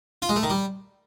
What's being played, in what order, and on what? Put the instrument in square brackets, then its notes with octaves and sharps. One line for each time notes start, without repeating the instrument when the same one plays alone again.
[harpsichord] F4
G#3
A3
D#3
G3